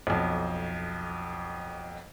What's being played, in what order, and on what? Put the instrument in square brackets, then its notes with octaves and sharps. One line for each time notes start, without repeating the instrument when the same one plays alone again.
[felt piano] B1 F2